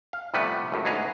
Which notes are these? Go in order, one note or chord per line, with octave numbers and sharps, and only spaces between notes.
F5
C3 F3 G3 A3 B3 B4
C#2 F#2 A2
D2 G#2 B3 G#4 A#5